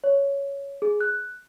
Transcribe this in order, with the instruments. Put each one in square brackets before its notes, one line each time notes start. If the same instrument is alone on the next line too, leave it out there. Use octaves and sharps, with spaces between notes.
[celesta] C#5
G#4
F#6